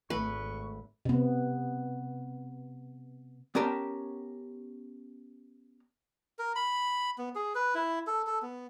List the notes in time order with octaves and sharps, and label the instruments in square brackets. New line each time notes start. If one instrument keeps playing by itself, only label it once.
[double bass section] G#1 [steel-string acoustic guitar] A3 [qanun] B4 [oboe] C#6
[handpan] C3 B3
[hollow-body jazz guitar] B3 C#4 G4 A#4 G5 A5
[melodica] A#4
B5
B3
G#4
B4
E4
A4
A4
B3